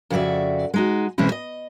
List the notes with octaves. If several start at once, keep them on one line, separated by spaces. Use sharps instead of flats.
F2 C#3 F#4 D5 E5
G#3 D#4 F#4
B2 E3 G#3 C4 C#4 E4
D#5